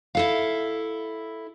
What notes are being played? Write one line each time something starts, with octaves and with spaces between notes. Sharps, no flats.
E4 A4 F5